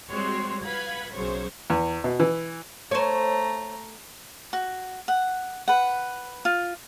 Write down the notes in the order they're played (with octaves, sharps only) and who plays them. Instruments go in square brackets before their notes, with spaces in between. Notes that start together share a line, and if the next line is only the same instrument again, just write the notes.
[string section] G3 G#3 C4 F#4 C#5 C6
B4 F5 F#5 B5 G#6
B1 F#2 C#3 F#3 C5 C#5
[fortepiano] E2
B2
E3
[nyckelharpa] A3 A#5 [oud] C5 C#5
[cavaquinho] F#4
F#5
B4 F#5
F4